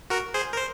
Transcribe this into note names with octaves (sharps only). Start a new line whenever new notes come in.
F#4 A#4
G#4 C5
A#4
C5